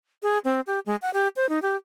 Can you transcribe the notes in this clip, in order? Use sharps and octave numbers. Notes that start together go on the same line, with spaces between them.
G#4
C4
G4
G#3
F#5
G4
C5
D#4
G4